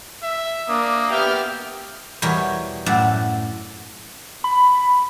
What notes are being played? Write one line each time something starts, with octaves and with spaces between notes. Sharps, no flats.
E5
A#3 D4 D#6
B3 G4 E5 G5 F6
E2 B2 G3 A#4 C#5 G#5
F#2 A2 D5 F#5 A5
B5